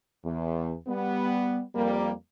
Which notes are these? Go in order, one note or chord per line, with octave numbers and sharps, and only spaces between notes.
E2
G3 B3
F2 G3 A#3